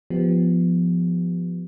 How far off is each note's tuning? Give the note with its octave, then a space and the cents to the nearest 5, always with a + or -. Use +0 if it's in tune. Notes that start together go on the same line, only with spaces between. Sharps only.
F3 +0 B3 +0 G4 +0